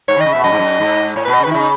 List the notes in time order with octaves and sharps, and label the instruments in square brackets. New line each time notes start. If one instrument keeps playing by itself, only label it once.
[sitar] G#2 [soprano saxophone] C#5
[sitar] D#3
[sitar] C#3 [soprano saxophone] D#5
[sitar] B2 [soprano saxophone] E5
[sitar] F#2 [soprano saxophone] D#5
[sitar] G#2
F#2
G#2
[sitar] A2 [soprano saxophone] C#5
[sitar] B2 [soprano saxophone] B4
[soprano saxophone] D#5
[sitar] C#3
[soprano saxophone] B4
[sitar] D#3
[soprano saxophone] E4
[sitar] C#3
[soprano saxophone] D#4